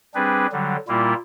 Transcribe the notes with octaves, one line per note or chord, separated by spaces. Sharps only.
G3 C4 D4 G#4 B4
D3 F#3 G3
A#2 G3 A#3 E4 F4